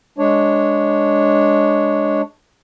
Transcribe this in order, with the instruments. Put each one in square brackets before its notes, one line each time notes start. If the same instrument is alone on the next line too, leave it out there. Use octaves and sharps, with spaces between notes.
[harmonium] G#3 D4 C#5